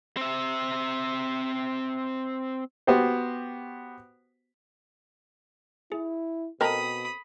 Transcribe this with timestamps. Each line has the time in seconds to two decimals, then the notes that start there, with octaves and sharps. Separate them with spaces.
0.17 C4 E5
2.87 B3 F#4 G4 C5
5.92 E4 G#4
6.61 B2 C4 A4 A#4 D#5 A#5 B5 D#6